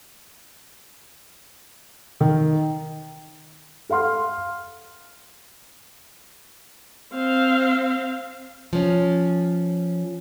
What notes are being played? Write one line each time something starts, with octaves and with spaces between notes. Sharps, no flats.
D#3
A4 F5 F#5 C6 F6
C4 F5
F3 C#4